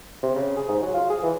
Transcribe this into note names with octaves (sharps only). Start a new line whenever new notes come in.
C3
C#3
G#4
G#2
F#3
F4
G#4
E3